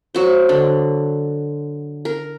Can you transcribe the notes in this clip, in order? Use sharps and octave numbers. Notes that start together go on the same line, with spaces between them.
F#3 F#4 C5
D3
A#4